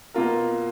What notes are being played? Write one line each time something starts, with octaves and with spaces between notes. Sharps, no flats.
B2 A#3 F4 A#4